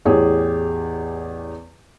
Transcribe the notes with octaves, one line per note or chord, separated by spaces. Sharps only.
A1 E2 G4 G#4 C#5